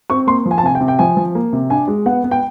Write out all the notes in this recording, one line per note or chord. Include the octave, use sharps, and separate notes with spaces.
C4 C#6
A#3 C6
F3
G#5
A5
C3 G#5
G5
C3
G5
F3 G#5
F3
A#3
C3
D4 G#5
G#3
B3 F#5
B3
G5